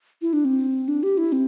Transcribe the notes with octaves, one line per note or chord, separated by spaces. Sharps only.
E4
D4
C4
D4
G4
E4
C4